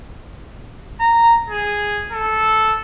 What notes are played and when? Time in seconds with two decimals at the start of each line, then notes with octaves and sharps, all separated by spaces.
1.00 A#5
1.49 G#4
2.12 A4